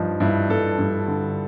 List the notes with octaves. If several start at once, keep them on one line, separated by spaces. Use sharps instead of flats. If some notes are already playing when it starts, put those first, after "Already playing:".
Already playing: G2 F3 D#4
G2 E4
G2 A4
G2
D3